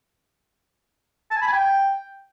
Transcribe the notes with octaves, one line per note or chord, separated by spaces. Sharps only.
A5
G#5
B5
G#5
G5